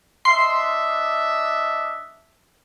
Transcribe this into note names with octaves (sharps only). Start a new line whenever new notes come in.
D4 D#5 E5 C6 C7